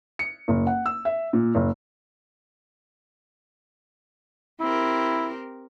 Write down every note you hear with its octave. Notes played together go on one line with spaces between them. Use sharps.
C#7
F#1
F#5
E6
E5
A#2
F#1
C4 E4 G4 A#4